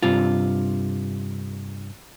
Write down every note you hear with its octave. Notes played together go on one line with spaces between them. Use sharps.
G2 C3 F4